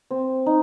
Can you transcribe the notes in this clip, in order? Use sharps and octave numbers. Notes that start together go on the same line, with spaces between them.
C4
D#4